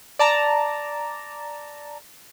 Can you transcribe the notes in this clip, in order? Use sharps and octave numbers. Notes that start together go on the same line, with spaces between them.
D5 A5 A#5